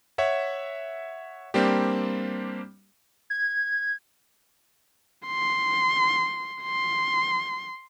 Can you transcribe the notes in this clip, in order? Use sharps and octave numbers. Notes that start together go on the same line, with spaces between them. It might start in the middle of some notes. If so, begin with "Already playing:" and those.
C#5 E5 F#5
G3 A#3 C4 D4 G4
G#6
C6
C6